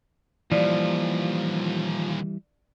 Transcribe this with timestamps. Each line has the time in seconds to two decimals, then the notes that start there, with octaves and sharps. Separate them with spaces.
0.52 D#2 A#2 E3 F3 G3 D5